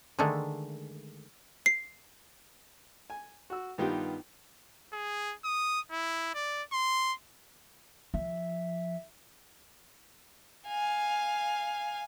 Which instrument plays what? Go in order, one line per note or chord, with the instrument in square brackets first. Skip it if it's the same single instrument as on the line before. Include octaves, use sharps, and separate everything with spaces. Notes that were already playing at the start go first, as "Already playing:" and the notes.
[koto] D3 D#3 G#3 A3
[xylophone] C7
[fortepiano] G#5
F#4 E6
G2 D#3 B3 D#4 F4 G4
[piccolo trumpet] G#4
D#6
E4
D5
C6
[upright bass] F3 [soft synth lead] E5
[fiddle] F5 G#5